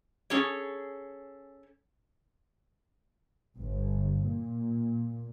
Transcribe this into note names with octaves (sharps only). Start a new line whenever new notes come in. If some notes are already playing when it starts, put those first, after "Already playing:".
C#4 G#4 A4 C#5
G1
A#2